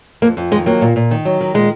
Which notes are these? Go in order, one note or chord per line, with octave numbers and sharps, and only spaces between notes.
F2 A#3
F2
D#3 G#3
F#3 A#3
A#2
A#2
D#3
F#3
D#3
A#2 G#3